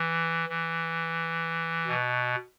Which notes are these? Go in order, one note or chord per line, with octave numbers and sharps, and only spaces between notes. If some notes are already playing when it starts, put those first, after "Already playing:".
Already playing: E3
E3
B2